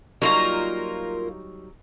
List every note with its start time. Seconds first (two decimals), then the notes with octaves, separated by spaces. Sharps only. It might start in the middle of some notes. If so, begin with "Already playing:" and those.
0.22 F#3 G3 A#3 D#4 F4 A#4